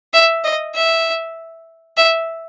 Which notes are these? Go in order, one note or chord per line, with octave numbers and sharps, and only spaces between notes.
E5
D#5
E5
E5